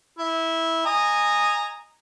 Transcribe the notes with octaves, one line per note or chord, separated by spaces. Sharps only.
E4
D#5 G#5 A#5